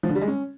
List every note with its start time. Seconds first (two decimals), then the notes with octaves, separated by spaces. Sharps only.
0.03 F3
0.09 D3
0.15 G3
0.22 G#3
0.28 C#4